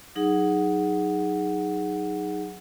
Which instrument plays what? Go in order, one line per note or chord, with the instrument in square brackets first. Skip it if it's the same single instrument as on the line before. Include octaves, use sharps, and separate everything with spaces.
[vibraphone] F#3 D#4 G#4 F#5